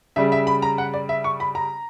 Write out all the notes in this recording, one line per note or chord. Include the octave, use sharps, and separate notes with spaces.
C#3 G3 E5
E5
B5
A#5
F#5
D5
E5
C#6
B5
A#5